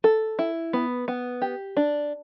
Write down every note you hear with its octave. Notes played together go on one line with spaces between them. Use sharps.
A4
E4
B3
B3
G4
D4